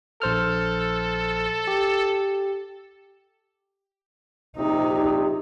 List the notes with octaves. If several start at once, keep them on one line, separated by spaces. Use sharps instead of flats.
A#1 A4 C5 F6
G4
A#1 C3 D#4